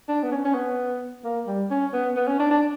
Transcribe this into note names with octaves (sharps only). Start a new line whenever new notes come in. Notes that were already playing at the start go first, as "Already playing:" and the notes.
D4
B3
C#4
C#4
B3
A#3
G3
C#4
B3
B3
C#4
D4
D4